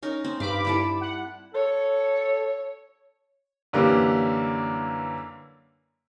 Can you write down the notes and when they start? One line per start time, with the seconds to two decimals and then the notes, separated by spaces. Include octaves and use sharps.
0.03 C#4 D#4 A#4
0.24 C4
0.40 G2 F5 B5 D6
0.65 G3 E4 A4
1.01 F#5
1.54 A4 C#5
3.73 F#2 D3 E3 G3 A#3 D6